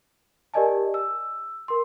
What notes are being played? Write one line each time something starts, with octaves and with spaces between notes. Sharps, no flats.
G4 A#4 D5 D#5 G#5 A5
E6
A#4 C6